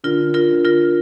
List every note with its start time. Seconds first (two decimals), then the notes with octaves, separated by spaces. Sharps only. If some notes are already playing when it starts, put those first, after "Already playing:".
0.04 D3 F4 A#4
0.34 F4 A#4
0.50 D3
0.65 F4 A#4